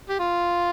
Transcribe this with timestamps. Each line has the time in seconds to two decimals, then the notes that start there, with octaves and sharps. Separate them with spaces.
0.09 G4
0.19 F4